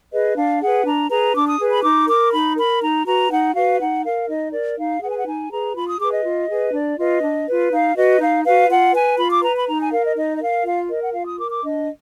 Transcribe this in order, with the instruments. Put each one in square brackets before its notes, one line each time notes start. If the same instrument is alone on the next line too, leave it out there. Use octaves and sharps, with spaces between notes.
[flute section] G#4 B4 D#5
D4 F5
G#4 B4 F#5
D4 A#5
G#4 B4 A#5
D4 D6
D#6
G#4 B4
B5
D#4 D6
A#4 D6
D#4 B5
A#4 B5
D#4 A#5
F#4 B4 A#5
D#4 F#5
F#4 B4 F5
D#4 F#5
A#4 F5
D#4 D#5
A#4 D5
D#4 F5
G#4 B4 F#5
G#5
F#5
D#4 G#5
G#4 B4 A#5
F4 B5
D#6
G#4 B4 D6
D#5
F4
G#4 B4
D4 D5
F4 B4 D#5
D4
F4 B4
D#4 F5
F#4 B4 D#5
D#4 F5
F#4 B4 F5
F4 F#5
B4 G#5
F4 B5
D6
B4 A#5
B5
D#4 A#5
G#5
A#4 F5
D#5
D#4 D#5
D#5
A#4 F5
F4 F5
A#4 D#5
F#5
F4 F5
D#6
A#4 D6
D6
D4 D#5